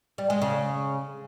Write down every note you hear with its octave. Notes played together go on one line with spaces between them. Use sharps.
G3
G#3
C#3